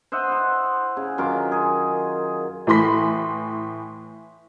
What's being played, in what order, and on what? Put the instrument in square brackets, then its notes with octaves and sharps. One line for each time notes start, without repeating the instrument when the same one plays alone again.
[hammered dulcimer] C5 D#5 E5 F#5
E4 F#5
C#3
F#2 D#3 F4 D6
G#4
[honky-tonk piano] A2 E3 B5 C6 B6